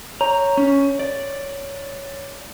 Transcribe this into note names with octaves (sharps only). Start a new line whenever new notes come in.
C#5 A#5
C#4
D5